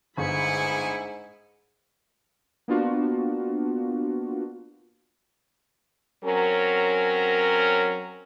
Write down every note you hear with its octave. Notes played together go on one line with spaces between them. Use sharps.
G1 G#2 E4 G#4 G#5 B5 C#7
A#3 B3 D4 F4 F#4
F#3 C4 C#4 A#4